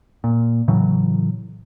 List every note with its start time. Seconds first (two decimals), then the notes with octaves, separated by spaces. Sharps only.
0.24 A#2
0.68 A2 C#3 E3 F#3